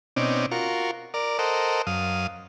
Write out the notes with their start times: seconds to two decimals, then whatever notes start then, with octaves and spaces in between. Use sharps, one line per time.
0.16 B2 C4 C#4 D#4 D5
0.51 F4 F#4 A#4 C#6
1.14 A#4 D5
1.39 A4 A#4 C5 D#5 F#5
1.87 F#2 F5 D#6